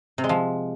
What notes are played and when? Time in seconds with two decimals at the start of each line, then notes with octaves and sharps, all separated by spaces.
0.18 C3
0.24 G#3
0.29 F3